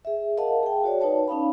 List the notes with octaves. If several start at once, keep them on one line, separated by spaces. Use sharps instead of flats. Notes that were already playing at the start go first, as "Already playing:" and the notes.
G#4 E5
A#4 D#5 F5 F#5 A5
G#4 G5
F#4 C#5 D5
D#4 B4 C#5 A5
C#4 D#4 F5 B5